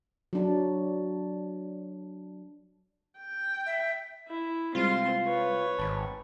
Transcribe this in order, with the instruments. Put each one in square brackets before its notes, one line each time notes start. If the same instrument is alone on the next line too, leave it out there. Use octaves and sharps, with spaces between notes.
[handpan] F#3 D4
[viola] G5
[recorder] E5
[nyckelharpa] E4
[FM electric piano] C3 G3 G#3 [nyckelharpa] C4 C6 [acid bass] F4
[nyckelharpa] B4 C#5
[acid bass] G#1 [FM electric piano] A5 B5